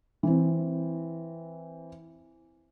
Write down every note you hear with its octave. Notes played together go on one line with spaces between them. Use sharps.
E3 C4